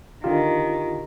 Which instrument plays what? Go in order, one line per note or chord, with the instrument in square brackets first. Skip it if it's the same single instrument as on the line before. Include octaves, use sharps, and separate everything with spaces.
[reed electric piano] D3 F4 [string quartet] D#3 [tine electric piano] G4